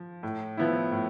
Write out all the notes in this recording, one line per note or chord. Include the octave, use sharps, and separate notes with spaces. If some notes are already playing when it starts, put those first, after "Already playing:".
Already playing: F3
A2
F3 B3 E4
A2